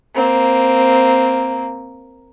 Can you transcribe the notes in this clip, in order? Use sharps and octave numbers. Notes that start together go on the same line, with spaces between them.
A#3 C4